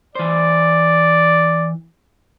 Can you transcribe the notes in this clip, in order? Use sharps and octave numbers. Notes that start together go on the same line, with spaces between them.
E3 C5 D5